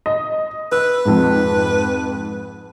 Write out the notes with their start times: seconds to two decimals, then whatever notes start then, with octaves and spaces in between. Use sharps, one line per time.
0.06 D#5
0.72 B4 E6
1.05 F2 G#2